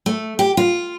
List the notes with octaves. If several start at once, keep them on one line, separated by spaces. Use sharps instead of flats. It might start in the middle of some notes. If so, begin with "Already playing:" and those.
A3
G4
F4